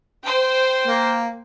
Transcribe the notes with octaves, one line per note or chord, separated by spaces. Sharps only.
C5 G5
A#3